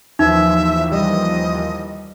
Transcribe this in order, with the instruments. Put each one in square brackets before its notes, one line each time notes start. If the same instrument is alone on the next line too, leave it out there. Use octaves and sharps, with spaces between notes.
[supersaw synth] D#2 E3 F3 [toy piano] D#4 [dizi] E5
[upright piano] G3 [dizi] D#5